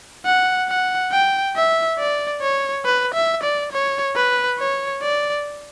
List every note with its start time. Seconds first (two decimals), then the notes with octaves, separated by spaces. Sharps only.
0.25 F#5
0.68 F#5
1.12 G5
1.55 E5
1.99 D5
2.42 C#5
2.85 B4
3.14 E5
3.43 D5
3.72 C#5
4.16 B4
4.59 C#5
5.02 D5